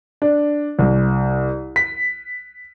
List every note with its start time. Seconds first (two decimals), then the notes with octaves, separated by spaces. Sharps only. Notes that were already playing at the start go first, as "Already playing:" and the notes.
0.22 D4
0.79 C2
1.76 B6